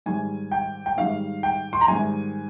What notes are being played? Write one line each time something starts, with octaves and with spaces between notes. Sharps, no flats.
G#2 D#3 G3 G#5
G5
G5
G#2 D#3 G3 F5
G5
C6
A#5
G#2 D#3 G3 G#5